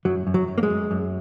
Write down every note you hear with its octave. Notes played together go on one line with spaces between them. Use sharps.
F#2 F#3
F#2
F#3
F#2
A#3
G#3
F#2
F#2